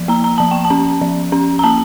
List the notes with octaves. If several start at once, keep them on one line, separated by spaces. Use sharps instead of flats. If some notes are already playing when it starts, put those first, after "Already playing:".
Already playing: F3
A#3 A#5
A#5
F3 A5
G5
A5
C#4
F3
C#4
A#5
A#3 A5